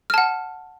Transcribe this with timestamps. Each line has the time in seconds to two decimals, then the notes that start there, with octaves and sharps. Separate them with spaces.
0.10 F6
0.14 A5
0.18 F#5